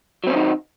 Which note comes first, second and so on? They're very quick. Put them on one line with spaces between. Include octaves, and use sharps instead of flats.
F#3 C4 C#4 D#3 D#4